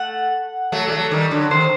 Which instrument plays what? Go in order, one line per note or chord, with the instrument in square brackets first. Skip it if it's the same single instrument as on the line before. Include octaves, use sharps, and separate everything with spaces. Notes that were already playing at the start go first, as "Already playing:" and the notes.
Already playing: [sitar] A3 [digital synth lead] F#5
[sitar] F#3 A3
G3
F#3 A3
D#3 G3
D3 F#3
[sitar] C3 D#3 [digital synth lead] C5